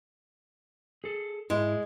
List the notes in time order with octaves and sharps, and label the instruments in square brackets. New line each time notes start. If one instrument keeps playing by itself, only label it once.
[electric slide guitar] G#4 A4
[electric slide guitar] G#2 E4 [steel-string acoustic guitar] G#3